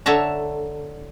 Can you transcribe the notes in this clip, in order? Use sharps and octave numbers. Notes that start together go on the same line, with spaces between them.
D3 C#5 E5 A5 A#5